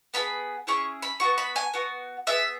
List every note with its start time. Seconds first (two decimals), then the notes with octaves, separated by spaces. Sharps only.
0.14 B3 E4 G#4 B5
0.67 C#4 E4 G#4 C#6
1.02 B5
1.20 B3 F#4 C#6
1.38 B5
1.56 G#5
1.74 B3 F#4
2.27 B3 G#4 E5